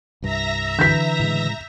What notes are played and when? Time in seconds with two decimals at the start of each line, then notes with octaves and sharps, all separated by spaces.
0.22 C2 G2 E5 A#5 A#6
0.79 D3 E3 B4 G6 B6
1.20 A2 C#3 G#3